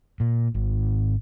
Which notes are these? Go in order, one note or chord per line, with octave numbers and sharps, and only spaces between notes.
A#2
G#1